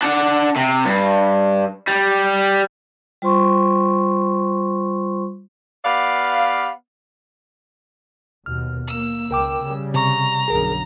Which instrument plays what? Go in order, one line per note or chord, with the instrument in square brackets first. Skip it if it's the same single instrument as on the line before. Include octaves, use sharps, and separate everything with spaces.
[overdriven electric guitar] D4 F#5
C3
G2
G3
[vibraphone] G3 F4 C5 C6 C#6
[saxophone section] B3 G4 D5 F5
[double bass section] D#2 B2 [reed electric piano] F6
[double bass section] A#3 [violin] E6
[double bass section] C#2 [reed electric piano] A#4 G5 D6
[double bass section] C#3 G3
[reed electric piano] C3 C#6 [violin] A#5
[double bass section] B1 F#2 D3 [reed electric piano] G#4 A#4